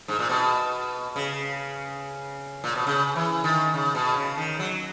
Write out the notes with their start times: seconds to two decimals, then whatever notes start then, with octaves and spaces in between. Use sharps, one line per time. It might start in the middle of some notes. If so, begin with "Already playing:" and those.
0.08 G#2
0.19 A#2
0.29 B2
1.16 C#3
2.64 A#2
2.75 B2
2.87 C#3
3.16 E3
3.44 D#3
3.74 C#3
3.95 B2
4.16 C#3
4.38 D#3
4.59 F#3